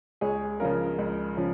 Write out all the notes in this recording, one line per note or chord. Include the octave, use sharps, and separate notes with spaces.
C#2 G#4 C#5
C#3 F3 C#4 F4 A#4
C#2
C#3 F3 C#4